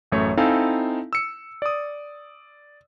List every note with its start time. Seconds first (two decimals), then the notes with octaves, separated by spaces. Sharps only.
0.12 A1 F#2 A3 C#5
0.37 C4 D#4 E4 A4 F5 G#5
1.13 E6 C#7
1.62 D5 D#6